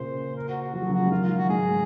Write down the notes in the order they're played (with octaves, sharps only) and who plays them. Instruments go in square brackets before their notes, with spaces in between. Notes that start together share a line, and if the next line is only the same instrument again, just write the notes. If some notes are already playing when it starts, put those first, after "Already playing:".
Already playing: [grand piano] A#2 C#3 [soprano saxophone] C5
[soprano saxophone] A#4
F#4
F#4
[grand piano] F3 [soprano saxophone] F#4
[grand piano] F#3
[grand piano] C#3 F3 [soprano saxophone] F#4
[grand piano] G#3
[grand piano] D#3 F#3 [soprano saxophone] F4
[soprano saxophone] F4
F#4
[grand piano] G#2 [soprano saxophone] G#4